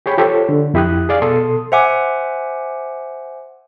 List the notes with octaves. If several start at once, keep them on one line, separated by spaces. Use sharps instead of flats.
G4 G#4 C#5 G5 B5
F4 G4 A4 C5 C#5
D3
F2 E4 G4 D#6 F#6
G#4 D5 F5
B2 A4 C6 D#6
C5 E5 F#5 G#5 D6